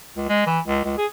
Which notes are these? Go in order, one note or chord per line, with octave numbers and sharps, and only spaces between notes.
C#2
G#3
E3
C#2
C#2
G#4